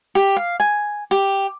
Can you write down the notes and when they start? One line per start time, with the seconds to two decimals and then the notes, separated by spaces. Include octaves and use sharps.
0.15 G4
0.37 F5
0.60 G#5
1.11 G4